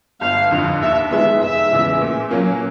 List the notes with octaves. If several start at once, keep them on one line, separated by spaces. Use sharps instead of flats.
G1 F5
F2 D3
D#2 E5
D#3 G#3 B3 E5
F1 E5
E2 C#3 E3 G#3
A#2
F#3 A#3 C#4